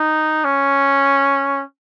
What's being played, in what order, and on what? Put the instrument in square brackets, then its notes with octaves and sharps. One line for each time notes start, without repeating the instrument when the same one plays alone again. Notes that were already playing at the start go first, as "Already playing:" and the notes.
Already playing: [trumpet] D#4
C#4